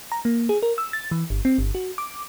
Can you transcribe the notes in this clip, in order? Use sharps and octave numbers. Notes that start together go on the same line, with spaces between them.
A#5
A#3
G#4
A#4
E6
A6
E3
G1
C4
G1
F#4
D6